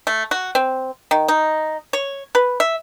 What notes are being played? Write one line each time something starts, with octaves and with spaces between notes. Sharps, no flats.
A3
F#4
C4
D#3
D#4
C#5
B4
E5